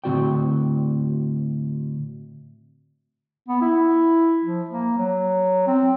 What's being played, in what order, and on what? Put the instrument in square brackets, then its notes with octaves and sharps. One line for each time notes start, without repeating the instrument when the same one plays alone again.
[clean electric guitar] A2 D3 C4 F#4 D5 G5
[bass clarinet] B3
E4
F3
A#3
F#3
C4